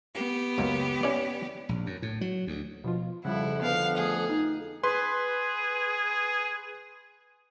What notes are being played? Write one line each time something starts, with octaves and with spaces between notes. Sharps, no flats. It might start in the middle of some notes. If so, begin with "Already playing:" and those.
B3 G4
C#2 F#2 A#3
C#4 E4 D5
A#1
F#2
A2
F#3
D2
B2 F3 F4
F2 C#3 F3 G3 E4 F#5
D3 B3 B4 F5 G5
A3 G#4
D#4
G#4 B4 C6